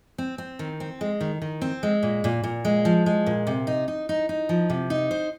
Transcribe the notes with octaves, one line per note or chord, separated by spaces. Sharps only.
C4
C4
D#3
C4
G#3
D#3
D#3
C4
G#3
A#2
A#2
A#2
G#3
F3
G#3
A#2
C3
D#4
D#4
D#4
D#4
F3
C3
D#4
C5